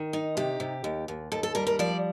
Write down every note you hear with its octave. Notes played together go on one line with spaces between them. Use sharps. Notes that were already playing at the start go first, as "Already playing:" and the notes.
Already playing: D#3
D#4
C3 G4
C3
D#2
D#2
D#2 A4
A4
G3 A#4
A#4
F3 D5